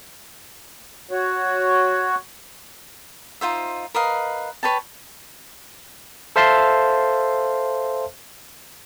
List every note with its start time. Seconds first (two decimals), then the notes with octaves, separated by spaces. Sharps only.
1.11 F#4 C#5
3.41 D#4 F4 C5 E5
3.94 A#4 B4 D#5 F5
4.63 B4 C#5 G5 A5
6.36 A4 C5 E5 F5 A5 C6